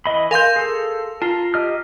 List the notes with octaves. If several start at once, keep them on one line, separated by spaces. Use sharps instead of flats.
E3 D#5 B5
A#4 F5 G#5 C6 G6
G#4 A4
F4 A5 A#5
G4 D#5 F6